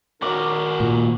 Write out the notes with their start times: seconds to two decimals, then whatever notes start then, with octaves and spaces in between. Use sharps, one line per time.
0.22 D#3 D#4 F#4 A#4 D6
0.80 A#2